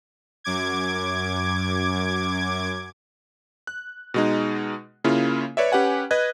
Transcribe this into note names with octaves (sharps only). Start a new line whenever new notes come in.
F#2 D6 G#6
F#6
B2 G#3 D#4
C#3 A#3 C#4 E4 F4
B4 C#5 D5 E5
C#4 G4 B4 F#5 G#5
B4 D#5 F#6 G#6